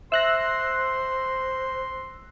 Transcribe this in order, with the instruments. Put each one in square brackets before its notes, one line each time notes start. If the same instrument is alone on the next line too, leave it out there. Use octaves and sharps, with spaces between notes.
[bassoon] C5 [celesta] E5 [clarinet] C6 [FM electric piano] E6 F#6 A#6